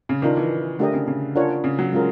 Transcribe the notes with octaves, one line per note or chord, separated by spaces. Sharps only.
C#3
D#3 D4 F4 A#4
E3
D3 A3 D4 G4 A#4 D#5
C#3
C#3
D4 F4 A#4 C#5 F#5
C#3
F#3
G#3 C#4 F4 A#4